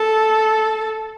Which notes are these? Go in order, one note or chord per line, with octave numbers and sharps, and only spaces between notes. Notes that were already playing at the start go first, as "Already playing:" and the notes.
Already playing: A4